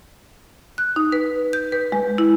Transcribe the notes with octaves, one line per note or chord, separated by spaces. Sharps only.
F#6
D#4
B4
G6
B4
G#3
E4